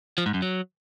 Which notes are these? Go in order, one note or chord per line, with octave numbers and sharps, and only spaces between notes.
F3
G#2
F#2
F#3